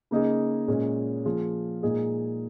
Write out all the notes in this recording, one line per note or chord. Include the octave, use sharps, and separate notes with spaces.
C#3 A#3 D#4 G#4
A#2 G#3 C#4
F3 A#3 F4 G#4
A#2 G#3 D#4 G#4